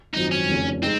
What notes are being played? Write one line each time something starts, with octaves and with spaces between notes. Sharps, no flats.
G#1 F#2 F3 C4 D#4 F#4
C#4
F1 F2 C#3
G#3 C4 D#4